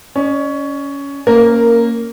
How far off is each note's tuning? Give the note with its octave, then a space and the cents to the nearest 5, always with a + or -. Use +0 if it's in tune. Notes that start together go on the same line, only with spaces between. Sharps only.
C#4 +15 D5 +45
A#3 -10 C#4 +0 A#4 +0